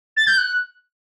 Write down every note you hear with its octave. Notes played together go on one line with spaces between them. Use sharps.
A6
G6
F#6